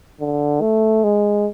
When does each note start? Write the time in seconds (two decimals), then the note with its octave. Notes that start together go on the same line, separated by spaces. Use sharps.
0.20 D3
0.61 A3
1.04 G#3